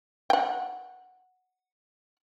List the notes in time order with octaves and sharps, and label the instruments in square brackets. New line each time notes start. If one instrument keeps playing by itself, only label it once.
[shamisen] F#5 G5